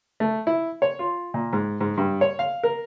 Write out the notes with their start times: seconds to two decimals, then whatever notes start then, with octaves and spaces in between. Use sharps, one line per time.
0.20 A3
0.47 E4
0.82 C#5
0.99 F4
1.34 A#2
1.53 G#2
1.81 G#2
1.98 G2
2.21 C#5
2.39 F5
2.63 A#4